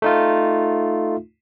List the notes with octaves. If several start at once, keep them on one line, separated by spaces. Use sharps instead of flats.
A3 D#4 F4